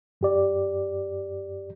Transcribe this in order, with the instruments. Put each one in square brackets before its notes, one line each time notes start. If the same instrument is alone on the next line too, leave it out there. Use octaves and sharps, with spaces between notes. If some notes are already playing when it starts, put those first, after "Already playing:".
[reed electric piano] F#2 G4 D5